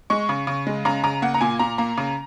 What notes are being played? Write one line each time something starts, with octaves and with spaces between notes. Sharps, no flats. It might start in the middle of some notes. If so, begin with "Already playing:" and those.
G#3 C#6
C#3
C#3
G#3
C#3 A#5
C#3 A#5
A#3 F#5
A#5
A#2 G#5
A#2 A#5
A#3 A#5
C#3